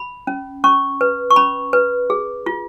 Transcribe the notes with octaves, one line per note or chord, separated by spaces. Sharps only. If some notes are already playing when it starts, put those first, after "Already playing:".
Already playing: B5
C#4
C#4 C#6
B4
C#6
C#4 B5
B4
G#4
F4